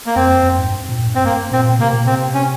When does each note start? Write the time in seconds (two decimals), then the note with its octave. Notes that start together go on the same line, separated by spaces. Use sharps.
0.06 A#3
0.16 F2 C4
0.43 F2
0.59 G#2
0.70 G2
0.89 A#2
1.06 G2
1.15 C4
1.24 G2 A#3
1.51 A#2 C4
1.79 C3 A#3
1.92 A#2
2.05 C3 C4
2.34 C#4